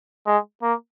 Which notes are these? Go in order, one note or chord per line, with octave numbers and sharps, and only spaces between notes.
G#3
A#3